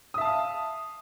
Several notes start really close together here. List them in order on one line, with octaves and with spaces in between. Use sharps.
D#6 E5 A5 F5